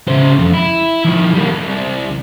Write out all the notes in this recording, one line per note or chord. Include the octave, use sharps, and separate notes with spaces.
C#3 C5
F2
E4
D#3 F3
G3 A#3
C2